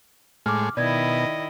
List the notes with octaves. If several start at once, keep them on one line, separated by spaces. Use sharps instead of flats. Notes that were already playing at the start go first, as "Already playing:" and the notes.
A2 G#3 D6 F6
B2 D#3 E4 D5 D#5 G#6